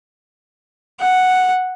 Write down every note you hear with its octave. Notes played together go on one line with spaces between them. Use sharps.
F#5